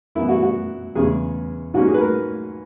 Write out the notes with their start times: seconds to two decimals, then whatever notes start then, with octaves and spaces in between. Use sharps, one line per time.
0.15 F#2 E3 B3 E4
0.29 F#4
0.43 F#4
0.95 E2 C#3 G#3 C#4 G#4
1.74 G#2 F#3 A#3 C#4 F#4
1.88 G#4
1.94 B4
2.01 A#4